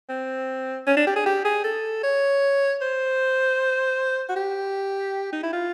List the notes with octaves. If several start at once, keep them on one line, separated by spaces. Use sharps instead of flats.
C4
C#4
D4
G4
G#4
G4
G#4
A4
C#5
C5
F#4
G4
D#4
E4
F4